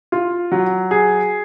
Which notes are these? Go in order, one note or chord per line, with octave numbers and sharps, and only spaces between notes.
F4
F#3
G#4